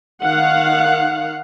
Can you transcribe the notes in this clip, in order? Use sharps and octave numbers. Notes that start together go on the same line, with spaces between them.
D#3 F5 F#5